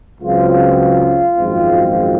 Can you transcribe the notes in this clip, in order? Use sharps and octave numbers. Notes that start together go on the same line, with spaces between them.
C#2 C#3 F#3 C4 F4
G#1 F#2 F3 G#3 C4